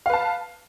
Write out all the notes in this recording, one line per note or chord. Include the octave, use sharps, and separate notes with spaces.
B4 F5 A5